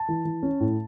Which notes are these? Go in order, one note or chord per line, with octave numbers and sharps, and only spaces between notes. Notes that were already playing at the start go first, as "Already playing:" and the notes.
Already playing: A5
E3
E3
C#4
A2